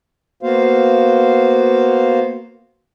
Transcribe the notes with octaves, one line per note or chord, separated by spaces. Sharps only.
A#3 B3 F#4 C5 F5